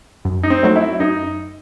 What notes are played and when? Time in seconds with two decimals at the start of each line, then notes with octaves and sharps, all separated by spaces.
0.25 F#2
0.43 D#4
0.50 C4
0.63 F#3 A3 D#4 F#4
0.76 E4
1.00 F#2 D#4